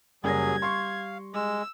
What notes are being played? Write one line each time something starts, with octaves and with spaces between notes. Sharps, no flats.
F#1 F#3 G3 G#4 G#6 A#6
F5 C6 C#6
G#3 E6